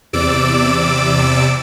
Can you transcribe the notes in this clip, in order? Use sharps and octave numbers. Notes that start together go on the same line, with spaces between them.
E2 C3 D5 D6 E6 D7